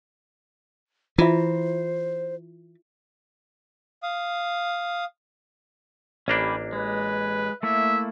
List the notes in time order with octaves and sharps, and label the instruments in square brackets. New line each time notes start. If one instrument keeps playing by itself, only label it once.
[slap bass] E3 [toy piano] E4 F4 E5 [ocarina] C5
[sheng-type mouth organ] F5 D#6
[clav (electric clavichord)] A1 A#3 D4 [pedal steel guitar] C#4 G4 B5
[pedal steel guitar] G#3 [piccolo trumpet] B4
[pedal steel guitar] A3 A#3 E4 [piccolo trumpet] E5